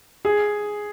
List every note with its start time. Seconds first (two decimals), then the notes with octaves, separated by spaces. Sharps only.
0.25 G#4